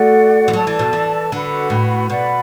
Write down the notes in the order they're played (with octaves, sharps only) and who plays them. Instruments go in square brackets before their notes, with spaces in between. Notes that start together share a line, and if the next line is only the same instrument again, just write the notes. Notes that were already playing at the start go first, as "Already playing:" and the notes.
Already playing: [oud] A3 [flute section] F#4 D5 F#5
[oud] E3
[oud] F#3 [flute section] A4 D5 A5
[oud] E3
B2
E3
[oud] D3 [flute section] F#4 B4 F#5 B5
[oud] A2
[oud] B2 [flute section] B4 D5 F#5 B5